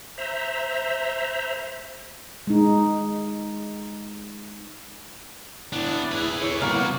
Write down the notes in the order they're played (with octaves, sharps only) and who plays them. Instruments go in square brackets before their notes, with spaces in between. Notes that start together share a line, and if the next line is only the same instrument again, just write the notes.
[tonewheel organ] C5 E5 A#5
[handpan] G#3 D#4
[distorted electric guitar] B3 D4 [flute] E4
[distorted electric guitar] G#4 B4
[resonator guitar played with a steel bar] C#5
[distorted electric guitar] C2 F#4 [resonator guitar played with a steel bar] A#3 B3